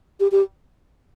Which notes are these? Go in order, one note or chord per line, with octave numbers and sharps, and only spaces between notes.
G4
G4